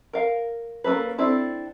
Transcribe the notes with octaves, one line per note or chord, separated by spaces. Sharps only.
A#4 F5
A#3 C#4 D4 A4 B4
C4 D4 E4 A4